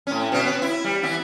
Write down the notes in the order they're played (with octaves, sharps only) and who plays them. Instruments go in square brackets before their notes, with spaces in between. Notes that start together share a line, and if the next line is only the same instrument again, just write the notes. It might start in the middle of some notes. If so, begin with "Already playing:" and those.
[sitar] A2 C#4
B2 C#4
B3
E4
G3
E3 B3 E4